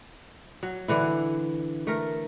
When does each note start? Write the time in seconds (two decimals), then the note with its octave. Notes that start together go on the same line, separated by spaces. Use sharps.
0.63 F#3
0.88 D3 E3 E4
1.87 A3 A#4